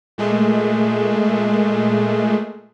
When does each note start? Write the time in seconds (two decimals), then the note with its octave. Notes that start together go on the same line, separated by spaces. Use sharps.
0.18 A#2 G#3 A3